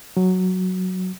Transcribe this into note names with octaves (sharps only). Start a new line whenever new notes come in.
F#3